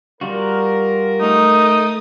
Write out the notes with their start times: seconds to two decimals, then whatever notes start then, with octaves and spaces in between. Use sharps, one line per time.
0.21 G3 F4 F#4 A#4
1.21 A3 D#4 D#6